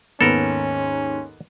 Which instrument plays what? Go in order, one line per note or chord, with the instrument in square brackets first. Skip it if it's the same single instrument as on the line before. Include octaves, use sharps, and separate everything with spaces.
[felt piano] D#2 G#2 [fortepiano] B3 [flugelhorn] C#4 [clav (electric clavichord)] A4 A#4